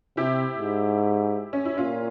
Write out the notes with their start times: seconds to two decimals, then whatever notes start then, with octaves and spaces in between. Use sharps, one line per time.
0.17 C3 E4 G4
0.58 G#2
1.53 C#4
1.65 E4
1.77 A#2 C#4 F4